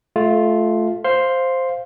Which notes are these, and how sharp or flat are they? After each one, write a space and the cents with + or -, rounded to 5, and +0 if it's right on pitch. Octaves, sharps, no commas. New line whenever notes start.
A3 -20 F4 +0
C5 +0 F5 +0 C6 +0